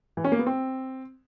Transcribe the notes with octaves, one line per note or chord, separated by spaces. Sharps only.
E3
C#4
A#3
B3
C4